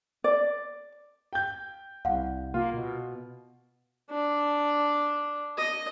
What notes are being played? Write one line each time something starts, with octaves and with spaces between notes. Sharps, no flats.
D5
G5 G6
C2 F5 F#5
A#3 F4
B2
D4
D#5